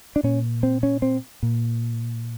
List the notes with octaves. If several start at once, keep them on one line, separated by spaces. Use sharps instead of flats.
D4
A#2 C#4
C4
C#4
C4
A#2